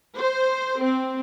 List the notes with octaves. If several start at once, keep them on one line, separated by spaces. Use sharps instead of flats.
C5
C4